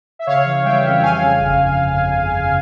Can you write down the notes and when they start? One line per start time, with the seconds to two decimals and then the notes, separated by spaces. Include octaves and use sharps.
0.19 E5
0.27 C#3 C#5 F5
0.45 E3
0.64 G3 E5 G5
0.84 F2
1.02 F2 F5 G#5
1.21 C#3
1.40 G1